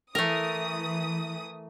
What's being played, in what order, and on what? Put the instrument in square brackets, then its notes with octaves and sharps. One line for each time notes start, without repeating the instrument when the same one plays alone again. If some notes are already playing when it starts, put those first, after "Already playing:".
[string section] E3 D#6 [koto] A3 A#4